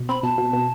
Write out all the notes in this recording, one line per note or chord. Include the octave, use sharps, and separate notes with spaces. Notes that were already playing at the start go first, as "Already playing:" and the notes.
Already playing: B2
C4 B5
B2 A5
B2
B2